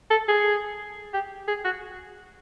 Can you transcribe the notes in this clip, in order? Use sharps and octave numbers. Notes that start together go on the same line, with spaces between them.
A4
G#4
G4
G#4
F#4